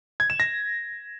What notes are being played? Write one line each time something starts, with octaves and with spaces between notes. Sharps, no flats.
G#6
E7
A#6